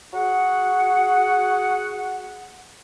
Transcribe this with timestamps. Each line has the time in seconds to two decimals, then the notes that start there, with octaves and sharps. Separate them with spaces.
0.13 F#4 G#4 F#5